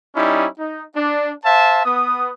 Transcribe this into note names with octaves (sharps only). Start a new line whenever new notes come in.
G3 C#4 D#4 E4
D#4
D4
C5 E5 F5 A5
B3 D#6